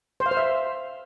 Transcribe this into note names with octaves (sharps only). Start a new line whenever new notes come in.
C5
F5
C5
E5